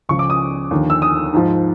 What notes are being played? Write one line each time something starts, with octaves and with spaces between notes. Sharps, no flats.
C#2 C#3 F3 C#6
D6
D#6
D#2 D3 F3
E6
D#6
G#2 F3